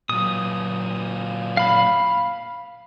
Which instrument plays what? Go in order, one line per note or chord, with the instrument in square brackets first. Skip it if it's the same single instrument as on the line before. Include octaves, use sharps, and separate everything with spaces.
[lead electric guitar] A#2 F#3 [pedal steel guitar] D#6
[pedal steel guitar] F5 B5